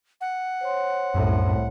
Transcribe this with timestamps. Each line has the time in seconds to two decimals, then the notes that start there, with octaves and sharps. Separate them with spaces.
0.21 F#5
0.61 C5 C#5 C6
1.14 C2 F#2 A2